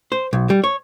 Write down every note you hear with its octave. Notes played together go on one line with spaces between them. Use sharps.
C5
B1
G3
C#5